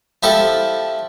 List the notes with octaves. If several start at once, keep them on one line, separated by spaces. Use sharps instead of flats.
F3 E4 G4 A4